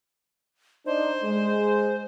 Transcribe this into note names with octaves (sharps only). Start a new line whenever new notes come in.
D4 D#4 C5
G#3